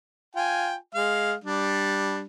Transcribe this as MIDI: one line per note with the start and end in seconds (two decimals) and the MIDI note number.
0.36 0.75 65
0.36 0.75 79
0.36 0.75 80
0.95 1.34 56
0.95 1.34 77
1.44 2.24 55
1.44 2.24 62